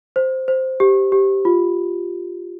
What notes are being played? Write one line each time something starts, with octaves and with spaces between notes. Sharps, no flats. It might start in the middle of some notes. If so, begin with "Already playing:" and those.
C5
C5
G4
G4
F4